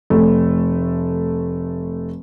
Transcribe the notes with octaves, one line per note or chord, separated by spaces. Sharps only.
F1 A3